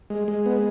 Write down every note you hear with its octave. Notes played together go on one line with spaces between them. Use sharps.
G#3
G#3
B3